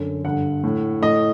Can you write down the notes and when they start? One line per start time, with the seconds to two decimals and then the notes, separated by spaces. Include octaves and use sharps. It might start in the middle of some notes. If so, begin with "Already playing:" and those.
Already playing: F#2 D3
0.24 G2 D3 F#5
0.64 A2
1.02 A2 D#5